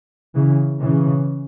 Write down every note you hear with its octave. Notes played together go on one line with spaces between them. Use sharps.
C#3 E3
C#3 E3